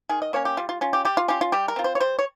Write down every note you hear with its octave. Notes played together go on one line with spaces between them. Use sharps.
D#3 G#4
D#5
A#3 C#4 C#5
G4
G3 F4
F4
C#4 F4
G4
G3 G4
F4
C#4 F4 G4
F4
G3 G4
A#4
C4 F4
C5
C#5
G3 C5
C#5